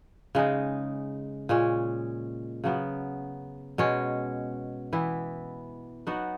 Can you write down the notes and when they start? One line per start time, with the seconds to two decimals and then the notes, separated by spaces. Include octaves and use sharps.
0.35 C#3 G#3 D#4
1.49 A#2 G#3 C#4
2.64 C#3 F#3 B3
3.78 B2 G#3 C#4
4.93 E3 B3 E4
6.07 F#3 B3 D#4 F#4